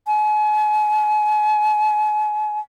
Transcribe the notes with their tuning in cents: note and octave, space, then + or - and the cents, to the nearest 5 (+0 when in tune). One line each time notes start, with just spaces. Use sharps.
G#5 +35